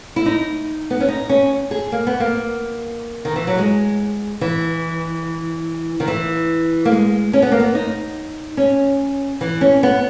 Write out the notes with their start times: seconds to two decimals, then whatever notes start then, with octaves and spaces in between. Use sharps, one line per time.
0.16 E4
0.26 D#4
0.90 B3
1.00 C#4
1.09 D#4
1.29 C#4
1.71 G#4
1.92 A#3
2.07 B3
2.20 A#3
3.25 D#3
3.36 E3
3.47 F#3
3.58 G#3
4.41 E3
6.00 D#3
6.08 E3
6.85 A#3
6.92 G#3
7.33 C#4
7.42 B3
7.51 A#3
7.60 B3
7.75 D#4
8.57 C#4
9.41 E3
9.61 C#4
9.83 B3